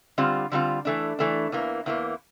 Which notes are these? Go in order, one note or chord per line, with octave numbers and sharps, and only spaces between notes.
D3 G3 C4 F4
D3 G3 C4 F4
E3 A3 D4
E3 A3 D4
E2 E3 A#3
E2 E3 A#3